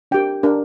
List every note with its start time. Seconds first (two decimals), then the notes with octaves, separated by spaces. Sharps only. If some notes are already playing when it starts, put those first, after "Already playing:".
0.11 D4 G4 A#4 G5
0.43 D4 G4 A#4